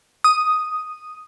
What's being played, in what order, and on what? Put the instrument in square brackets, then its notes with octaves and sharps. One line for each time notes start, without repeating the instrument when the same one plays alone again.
[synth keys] D#6